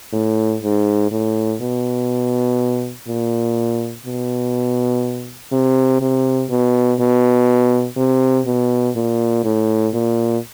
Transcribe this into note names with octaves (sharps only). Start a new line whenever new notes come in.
A2
G#2
A2
B2
A#2
B2
C3
C3
B2
B2
C3
B2
A#2
A2
A#2